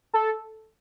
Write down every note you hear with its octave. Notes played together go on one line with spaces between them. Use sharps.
A4